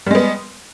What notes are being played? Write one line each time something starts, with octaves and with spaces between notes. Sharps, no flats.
G3 G#3 B3